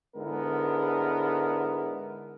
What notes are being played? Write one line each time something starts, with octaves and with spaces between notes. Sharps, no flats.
G#2 D3 G#3 B3 E4 A#4